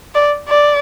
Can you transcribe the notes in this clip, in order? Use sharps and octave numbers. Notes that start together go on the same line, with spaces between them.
D5
D5